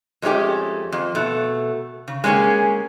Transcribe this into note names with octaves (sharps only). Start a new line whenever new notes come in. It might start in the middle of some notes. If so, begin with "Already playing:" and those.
F2 G#3 A3 C#4 G4 G5
F2
B2 A3
C#3
G#3 A#3 C#4 G4 G#4